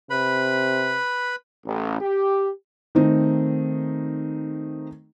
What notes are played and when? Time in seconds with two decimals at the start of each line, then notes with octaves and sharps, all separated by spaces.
0.10 C3 B4 B5
1.65 A1
2.00 G4
2.95 D#3 A3 C4 D#4